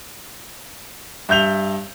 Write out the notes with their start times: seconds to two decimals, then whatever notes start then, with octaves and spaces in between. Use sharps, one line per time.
1.29 G2 E5 G6 F7 G7